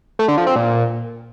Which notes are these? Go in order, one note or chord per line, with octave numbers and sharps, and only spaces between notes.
A3
D3
F3
C4
A#2